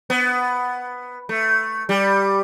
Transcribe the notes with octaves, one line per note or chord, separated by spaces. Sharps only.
B3
A3
G3